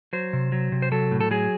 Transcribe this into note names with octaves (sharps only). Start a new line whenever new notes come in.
F#3 C5
C3
F#3
C3
C5
F#3 A4
A2
A4
F#3 G#4